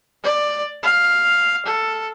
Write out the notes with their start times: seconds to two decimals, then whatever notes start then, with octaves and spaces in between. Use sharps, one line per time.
0.24 D5
0.83 F5
1.66 A4